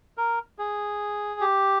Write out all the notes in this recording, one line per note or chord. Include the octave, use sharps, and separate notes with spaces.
A#4
G#4
G4